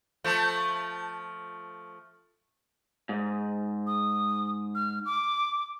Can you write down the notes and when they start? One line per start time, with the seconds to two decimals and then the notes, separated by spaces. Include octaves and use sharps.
0.24 F3 A3
3.09 G#2
3.87 D#6
4.75 F6
5.06 D6